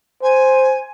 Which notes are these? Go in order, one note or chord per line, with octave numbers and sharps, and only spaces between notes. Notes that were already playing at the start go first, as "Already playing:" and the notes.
C5 G#5